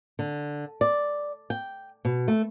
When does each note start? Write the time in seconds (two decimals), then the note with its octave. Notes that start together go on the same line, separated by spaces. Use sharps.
0.19 D3
0.81 D5
1.50 G5
2.05 B2
2.28 A3